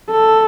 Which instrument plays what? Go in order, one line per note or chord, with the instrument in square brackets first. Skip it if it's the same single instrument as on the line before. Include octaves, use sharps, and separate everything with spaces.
[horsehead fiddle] A4